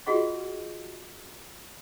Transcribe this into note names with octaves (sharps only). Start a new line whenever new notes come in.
F4 F#4 G#4 D#5 F#5 C#6